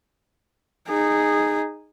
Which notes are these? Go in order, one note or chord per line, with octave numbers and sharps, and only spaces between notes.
D#4 G#4